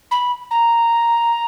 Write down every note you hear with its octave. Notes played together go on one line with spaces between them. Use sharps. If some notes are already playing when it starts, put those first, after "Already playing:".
B5
A#5